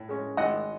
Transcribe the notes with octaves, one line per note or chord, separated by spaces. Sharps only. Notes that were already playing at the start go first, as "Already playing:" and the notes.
Already playing: A2
G#3 C#4
G#1 D#5 F#5